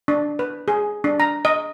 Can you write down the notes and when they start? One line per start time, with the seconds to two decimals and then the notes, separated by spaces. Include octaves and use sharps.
0.08 D4
0.39 B4
0.68 G#4
1.04 D4
1.20 A#5
1.45 D#5